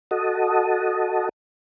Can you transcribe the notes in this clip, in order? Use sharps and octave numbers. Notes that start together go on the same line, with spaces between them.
F#4 A4 D#5